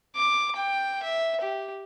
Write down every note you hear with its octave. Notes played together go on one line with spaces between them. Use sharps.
D6
G5
E5
G4